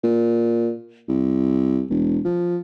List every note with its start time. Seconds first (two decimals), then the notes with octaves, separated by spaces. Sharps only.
0.04 A#2
1.08 C2
1.90 E1
2.25 F3